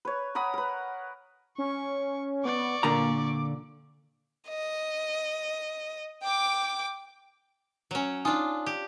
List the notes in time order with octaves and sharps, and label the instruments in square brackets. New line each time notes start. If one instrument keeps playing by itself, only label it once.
[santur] B4 C#5
A#4 F#5 B5 D#6
A#4 B4
[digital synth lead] C#4 [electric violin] C#6
[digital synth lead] B3 [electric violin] D5 C#6
[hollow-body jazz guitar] A#2 D3 A#5 [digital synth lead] A#3
[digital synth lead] D6
[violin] D#5
G5 D6
[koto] F#3 C#4
[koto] D4 F4 [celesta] D#4 G#5 D#6
[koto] G4